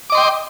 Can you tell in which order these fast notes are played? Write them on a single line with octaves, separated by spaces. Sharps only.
D6 D#5 C6 G5